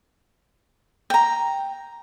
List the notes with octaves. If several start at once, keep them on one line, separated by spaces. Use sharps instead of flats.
G5 A#5